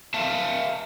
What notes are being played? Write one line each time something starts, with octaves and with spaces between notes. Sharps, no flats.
E5 F5 A5